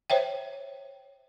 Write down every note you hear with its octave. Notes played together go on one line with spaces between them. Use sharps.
C5 C#5 E5 G5